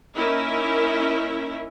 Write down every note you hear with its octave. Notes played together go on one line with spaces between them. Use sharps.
A#3 C#4 D#4 E4 A#4 E5